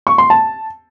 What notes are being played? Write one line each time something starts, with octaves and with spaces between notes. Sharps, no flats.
C#6
C6
A5